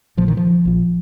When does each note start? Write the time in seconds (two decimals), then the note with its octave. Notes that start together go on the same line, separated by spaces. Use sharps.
0.17 A#1 A#2 F3
0.28 D#3
0.37 F3
0.65 A#1 A#2